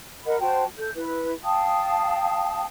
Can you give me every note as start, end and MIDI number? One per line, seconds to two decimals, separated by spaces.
0.25 0.36 70
0.25 0.36 75
0.25 0.36 78
0.25 0.36 83
0.40 0.64 66
0.40 0.64 72
0.40 0.64 79
0.40 0.64 81
0.78 0.90 69
0.78 0.90 91
0.95 1.33 64
0.95 1.33 71
1.44 2.64 77
1.44 2.64 79
1.44 2.64 81
1.44 2.64 87